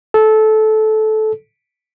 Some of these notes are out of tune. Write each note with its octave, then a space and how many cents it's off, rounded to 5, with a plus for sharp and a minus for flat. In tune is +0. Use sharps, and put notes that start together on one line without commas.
A4 -20